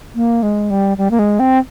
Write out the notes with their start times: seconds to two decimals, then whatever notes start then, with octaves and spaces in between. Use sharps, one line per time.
0.15 A#3
0.43 G#3
0.70 G3
0.98 G3
1.11 A#3
1.19 G#3
1.40 C4